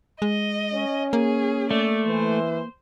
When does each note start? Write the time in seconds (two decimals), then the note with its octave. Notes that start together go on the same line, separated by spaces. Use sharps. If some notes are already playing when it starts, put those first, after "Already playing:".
0.22 G#3 D#5
0.72 C#4
1.13 A#3 G#4
1.71 A3 D5
2.06 E3 C5